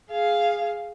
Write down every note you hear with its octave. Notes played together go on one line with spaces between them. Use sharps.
G#4 F5